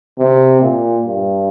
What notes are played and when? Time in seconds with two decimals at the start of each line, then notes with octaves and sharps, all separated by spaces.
0.19 C3
0.62 A#2
1.05 G2